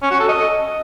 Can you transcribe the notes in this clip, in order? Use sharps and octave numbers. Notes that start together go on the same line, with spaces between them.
C#4
F#4
A4
D#5